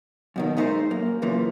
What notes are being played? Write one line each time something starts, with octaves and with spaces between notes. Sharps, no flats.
F#2 B2 D#3
G#3 A3 D#4 E4 A#4 C5
F#2 A#3
F#2 C#3 E3 F3 A#3